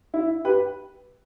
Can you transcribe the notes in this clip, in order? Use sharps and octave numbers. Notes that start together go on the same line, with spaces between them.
E4
G4 B4